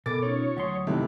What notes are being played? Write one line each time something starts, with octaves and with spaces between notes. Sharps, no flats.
B2 B3 A4 A#4 D6 A6
C#4 D#4 F4 C#5
D2 F#3 C6 D#6
C3 D#3 E3 A3 E5